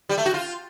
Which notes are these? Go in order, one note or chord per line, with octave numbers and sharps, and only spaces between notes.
G3
A3
F#4
F4